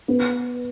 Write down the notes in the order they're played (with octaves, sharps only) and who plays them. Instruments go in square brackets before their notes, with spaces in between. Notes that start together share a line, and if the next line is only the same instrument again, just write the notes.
[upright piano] B3